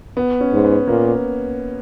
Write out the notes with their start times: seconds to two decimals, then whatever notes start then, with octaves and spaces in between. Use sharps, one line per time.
0.17 B3
0.40 C#4
0.52 G#2
0.64 B3
0.88 A#2 A#3